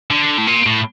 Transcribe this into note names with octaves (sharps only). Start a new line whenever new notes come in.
D3
A2
A#2
A2